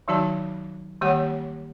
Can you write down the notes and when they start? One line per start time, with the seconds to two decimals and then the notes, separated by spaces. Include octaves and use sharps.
0.08 D#3 F#3 D#4 F#4 D5 A5
1.01 D#3 G3 A#3 G4 C#5 F#5